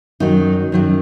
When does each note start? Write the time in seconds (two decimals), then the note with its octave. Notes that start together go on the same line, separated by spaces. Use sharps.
0.20 F#2 D#3 F#3 D#4
0.72 F#2 D#3 F#3